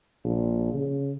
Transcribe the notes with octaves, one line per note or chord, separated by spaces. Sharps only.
A#1
C#3